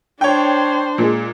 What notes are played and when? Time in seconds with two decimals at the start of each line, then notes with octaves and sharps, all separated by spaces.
0.21 D4 C5 C#5 G5
0.98 A#2 G#3